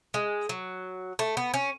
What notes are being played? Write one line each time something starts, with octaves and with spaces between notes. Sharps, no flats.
G#3
F#3
A3
B3
C#4